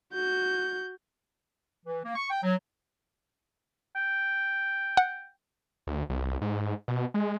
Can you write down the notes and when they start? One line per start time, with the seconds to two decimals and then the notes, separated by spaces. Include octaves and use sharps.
0.14 F#4 G6
1.85 E3
2.04 A#3
2.16 C#6
2.30 G5
2.43 F#3
3.95 G5
4.97 F#5
5.87 D2
6.09 C2
6.41 G#2
6.88 B2
7.14 G#3